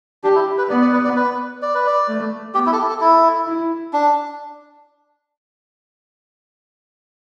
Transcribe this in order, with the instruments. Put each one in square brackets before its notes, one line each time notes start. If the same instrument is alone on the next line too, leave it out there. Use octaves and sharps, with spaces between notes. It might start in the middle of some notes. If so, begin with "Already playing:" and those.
[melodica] D4 [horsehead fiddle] G4
[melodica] E4
B4
[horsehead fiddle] B3 [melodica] D5
[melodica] D5
B4
D5
B4
D5
B4
D5
[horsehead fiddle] A3
[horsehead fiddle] B3 [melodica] G4
[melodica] E4
A4
G4
A4
[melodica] E4 [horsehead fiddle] A4
[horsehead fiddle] E4
[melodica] D4